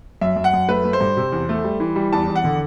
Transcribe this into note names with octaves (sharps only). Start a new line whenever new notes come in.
F#2 E5
F#2
F#5
F#2
A3 B4
A3
C5
G2
C3
E2
A3
G3
E3
G3
E2 A5
E2
F#5
D3